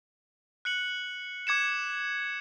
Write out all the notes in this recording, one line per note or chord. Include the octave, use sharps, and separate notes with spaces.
F#6 C#7 F#7
D6 G#6 C#7 E7